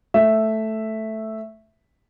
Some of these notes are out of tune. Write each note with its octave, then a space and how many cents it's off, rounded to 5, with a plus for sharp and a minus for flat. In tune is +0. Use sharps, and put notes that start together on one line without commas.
A3 +0 E5 +0